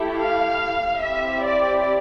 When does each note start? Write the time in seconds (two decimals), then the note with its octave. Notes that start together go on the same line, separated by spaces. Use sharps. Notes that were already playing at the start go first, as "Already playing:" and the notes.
Already playing: A3 E4 G4
0.16 F5
1.01 C4 E4 G4 E5
1.44 D5